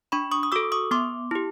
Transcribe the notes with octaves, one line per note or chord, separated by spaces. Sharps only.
D4 B5 C#6
C#6 D#6
D#6
F#4 A4 D6 E6
C#6 D#6
B3 C6 D6
E4 G4